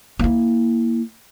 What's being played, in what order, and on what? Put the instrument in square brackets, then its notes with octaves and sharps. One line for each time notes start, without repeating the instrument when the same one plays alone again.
[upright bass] A#3 E4